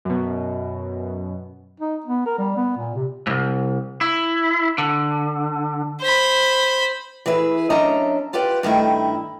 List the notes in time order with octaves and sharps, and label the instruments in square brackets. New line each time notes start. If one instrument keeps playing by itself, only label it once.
[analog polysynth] F#2 B2
[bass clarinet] D#4
B3
A#4
G3
B3
A#2
C3
[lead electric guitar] C2 G#2
E4
D3
[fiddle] C5 B5
[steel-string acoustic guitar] E3 G#4 B4 E5
F#2 C#4 D4 D#5 E5 A#5
F4 G4 B4 D5 F#5
G2 D#3 A3 E4